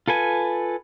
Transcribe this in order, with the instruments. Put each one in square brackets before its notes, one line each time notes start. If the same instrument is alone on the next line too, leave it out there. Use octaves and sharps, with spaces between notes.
[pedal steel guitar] F4 A4 B4 G#5